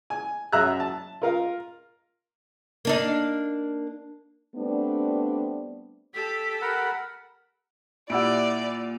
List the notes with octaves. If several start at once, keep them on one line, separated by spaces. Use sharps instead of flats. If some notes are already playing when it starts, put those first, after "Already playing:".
G#5
F#2 E5 A#5 E6 F#6
A5
F4 A#4 F5
A#3 D4 D#4
G3 A3 B3 C4 D4
G4 A4 B6
A#4 F#5 B5
A#2 G3 E4 D5 F#5 E6 D7